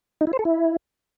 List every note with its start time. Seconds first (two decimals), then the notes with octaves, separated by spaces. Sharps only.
0.21 D#4
0.27 E4
0.33 C5
0.39 A4
0.45 E4